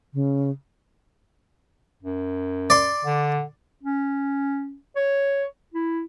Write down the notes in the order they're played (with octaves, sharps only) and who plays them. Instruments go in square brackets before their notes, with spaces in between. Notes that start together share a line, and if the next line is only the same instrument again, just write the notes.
[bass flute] C#3
[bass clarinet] F#2
[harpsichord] D5 C6
[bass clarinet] D3
[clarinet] C#4
C#5
E4